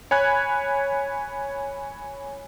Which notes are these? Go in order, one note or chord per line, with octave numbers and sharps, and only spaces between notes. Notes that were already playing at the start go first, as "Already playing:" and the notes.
C#5 G#5 B5 F#6 G#6